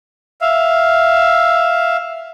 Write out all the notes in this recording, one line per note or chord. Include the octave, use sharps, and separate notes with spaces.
E5 F5